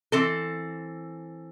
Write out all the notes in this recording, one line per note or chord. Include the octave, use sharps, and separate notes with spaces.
E3 C4 A4